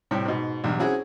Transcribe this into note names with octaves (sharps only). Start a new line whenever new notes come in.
A2 C3 G3
G#2 B2
B1 E2 G2
C4 C#4 E4 F#4 G#4